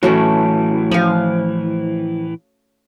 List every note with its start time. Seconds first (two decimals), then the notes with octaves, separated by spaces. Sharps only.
0.03 A2 E3 F#3 A3 C#4
0.91 F3 F5 G#5